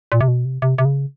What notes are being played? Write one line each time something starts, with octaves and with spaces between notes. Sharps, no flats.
A#2
C3
B2
C3
C3
C3
C#3